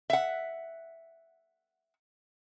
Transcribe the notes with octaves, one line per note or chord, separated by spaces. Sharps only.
E5 F#5